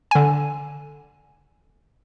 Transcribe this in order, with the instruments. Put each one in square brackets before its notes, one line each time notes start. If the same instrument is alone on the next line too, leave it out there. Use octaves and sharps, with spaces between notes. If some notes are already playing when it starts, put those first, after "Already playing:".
[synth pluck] D3 G#5